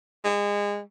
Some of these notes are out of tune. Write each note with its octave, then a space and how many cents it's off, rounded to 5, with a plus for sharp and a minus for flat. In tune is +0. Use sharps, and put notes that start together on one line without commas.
G#3 -30